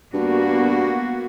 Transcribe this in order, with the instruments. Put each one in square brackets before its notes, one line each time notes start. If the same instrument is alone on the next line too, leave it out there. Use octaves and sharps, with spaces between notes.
[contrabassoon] G2 [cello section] A#3 B3 F#4